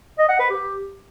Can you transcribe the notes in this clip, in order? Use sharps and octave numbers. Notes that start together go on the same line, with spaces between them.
D#5
F#5
B4
G4